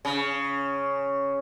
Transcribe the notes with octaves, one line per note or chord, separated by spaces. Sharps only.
C#3